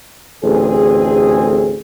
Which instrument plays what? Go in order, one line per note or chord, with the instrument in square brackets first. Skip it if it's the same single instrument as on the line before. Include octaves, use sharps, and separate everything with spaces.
[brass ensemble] A1 D2 C4 G#4